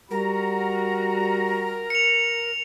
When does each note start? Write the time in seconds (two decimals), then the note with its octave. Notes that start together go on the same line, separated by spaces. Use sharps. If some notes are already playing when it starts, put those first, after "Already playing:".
0.11 G3 F#4 A#4 A#5
1.90 C#7 F7